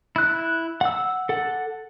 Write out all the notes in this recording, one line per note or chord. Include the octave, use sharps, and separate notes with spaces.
E4 F#6
F#5 E6
A4 F#5